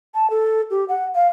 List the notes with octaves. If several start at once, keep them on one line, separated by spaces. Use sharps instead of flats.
A5
A4
G4
F#5
F5